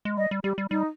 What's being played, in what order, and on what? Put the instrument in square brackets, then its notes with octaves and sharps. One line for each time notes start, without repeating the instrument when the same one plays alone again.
[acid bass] G#3
[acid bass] G3 [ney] D#5
[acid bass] G3
[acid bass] G3 [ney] G4
[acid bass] G3
[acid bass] G3 [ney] D#4